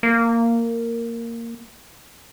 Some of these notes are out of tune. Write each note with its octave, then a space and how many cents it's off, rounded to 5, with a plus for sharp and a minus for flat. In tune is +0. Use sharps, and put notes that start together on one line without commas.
A#3 -10